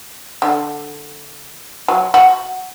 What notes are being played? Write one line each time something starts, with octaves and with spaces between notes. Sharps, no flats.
D3
F#3
F#4